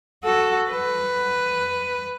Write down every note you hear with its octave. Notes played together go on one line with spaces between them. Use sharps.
F#4 A4
B4